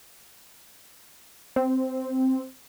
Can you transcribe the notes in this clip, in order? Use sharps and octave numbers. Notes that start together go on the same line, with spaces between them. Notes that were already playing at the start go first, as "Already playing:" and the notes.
C4